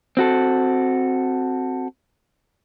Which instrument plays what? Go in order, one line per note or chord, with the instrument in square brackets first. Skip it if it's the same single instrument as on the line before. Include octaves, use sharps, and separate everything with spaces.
[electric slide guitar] C4 F#4 A4